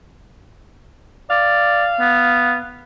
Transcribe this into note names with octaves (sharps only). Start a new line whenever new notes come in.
D5 F5
B3